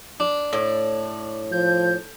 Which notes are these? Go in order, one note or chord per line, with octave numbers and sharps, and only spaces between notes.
D4
A2
F3 G6